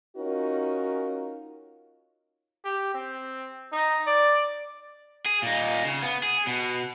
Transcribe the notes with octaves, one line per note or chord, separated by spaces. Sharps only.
C#4 D#4 F4 F#4 A#4
G4
C4
D#4
D5
G#4
A#2 D#4
C#3
B3
G#4
B2